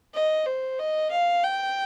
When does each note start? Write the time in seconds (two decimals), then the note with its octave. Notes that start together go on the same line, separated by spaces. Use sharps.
0.14 D#5
0.46 C5
0.79 D#5
1.11 F5
1.43 G5